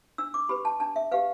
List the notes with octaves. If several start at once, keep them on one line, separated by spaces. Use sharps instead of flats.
D4 E6
D6
G4 B4 B5
A5
D4 A5
E5
G4 B4 F5